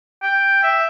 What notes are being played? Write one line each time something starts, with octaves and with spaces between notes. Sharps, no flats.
G5
E5